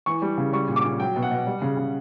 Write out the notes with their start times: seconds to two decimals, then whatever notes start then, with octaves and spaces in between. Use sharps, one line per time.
0.06 E3 C#6
0.22 G3
0.38 C#3
0.53 G3 C#6
0.68 A#2
0.76 D6
0.84 A#2
0.99 F#3 G5
1.16 B2
1.22 F#5
1.31 B2
1.47 G3
1.62 C#3
1.77 C#3